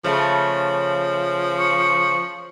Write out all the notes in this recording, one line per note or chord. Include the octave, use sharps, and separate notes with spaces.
C#3 F3 A3
C#6